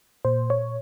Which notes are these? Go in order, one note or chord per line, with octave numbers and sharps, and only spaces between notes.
A#2 C5
C#5